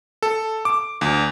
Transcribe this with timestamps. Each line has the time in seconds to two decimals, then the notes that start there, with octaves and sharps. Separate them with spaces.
0.22 A4
0.65 D6
1.01 D2